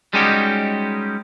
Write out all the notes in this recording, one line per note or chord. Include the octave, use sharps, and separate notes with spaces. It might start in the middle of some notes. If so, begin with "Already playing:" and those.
G3 G#3 C#4 D#4 F#4 G4